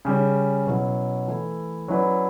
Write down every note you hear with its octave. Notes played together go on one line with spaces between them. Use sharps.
C#3 G3 C#4
B2 F#3 C#4 E4
E3 A3 E4
F#3 C#4 E4 B4 D5